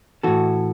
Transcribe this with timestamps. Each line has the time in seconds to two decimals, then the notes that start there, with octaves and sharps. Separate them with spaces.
0.23 A2 E3 F#4 A4